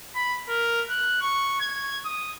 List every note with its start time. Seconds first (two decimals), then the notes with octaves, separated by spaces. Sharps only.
0.15 B5
0.49 A#4
0.90 F#6
1.21 C#6
1.61 G#6
2.05 D#6